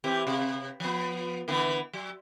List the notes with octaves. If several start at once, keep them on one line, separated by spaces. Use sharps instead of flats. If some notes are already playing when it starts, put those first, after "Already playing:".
E3 C4 G4
C3
F3 B3
D3 E3 B3
F#3